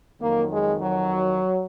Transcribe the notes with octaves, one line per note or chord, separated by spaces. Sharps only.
F2 D#3 F#3 A#3
G#3
F#3